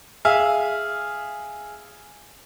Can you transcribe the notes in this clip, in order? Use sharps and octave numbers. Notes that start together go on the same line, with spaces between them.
G#4 E5 F5